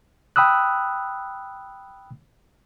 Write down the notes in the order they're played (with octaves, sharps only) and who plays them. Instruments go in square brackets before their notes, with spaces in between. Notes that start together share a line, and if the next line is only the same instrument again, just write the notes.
[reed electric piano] G5 B5 D#6 E6 F#6